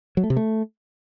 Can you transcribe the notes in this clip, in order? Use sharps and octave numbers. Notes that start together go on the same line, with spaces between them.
F#3
A3
C3
A3